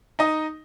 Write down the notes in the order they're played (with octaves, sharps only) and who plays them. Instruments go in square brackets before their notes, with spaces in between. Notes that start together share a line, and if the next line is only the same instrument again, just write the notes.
[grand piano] D#4 D#5